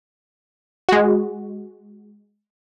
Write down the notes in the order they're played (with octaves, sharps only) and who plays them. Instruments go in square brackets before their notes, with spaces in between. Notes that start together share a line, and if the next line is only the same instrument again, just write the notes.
[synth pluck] G#3 F#4